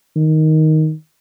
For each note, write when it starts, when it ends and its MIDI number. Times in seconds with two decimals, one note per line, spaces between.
0.16 0.93 51